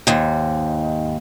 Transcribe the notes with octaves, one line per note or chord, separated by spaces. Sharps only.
D#2 G#2